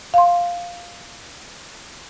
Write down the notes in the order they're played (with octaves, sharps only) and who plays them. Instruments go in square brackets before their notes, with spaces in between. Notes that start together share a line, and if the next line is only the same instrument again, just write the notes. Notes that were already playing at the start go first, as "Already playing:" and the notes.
[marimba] F5 C6